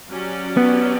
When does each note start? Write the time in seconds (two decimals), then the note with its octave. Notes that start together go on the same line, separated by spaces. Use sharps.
0.10 F#3 C#4 G4 D5
0.57 B3